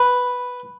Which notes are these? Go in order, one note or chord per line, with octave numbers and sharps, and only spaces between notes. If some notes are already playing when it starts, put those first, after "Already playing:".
Already playing: B4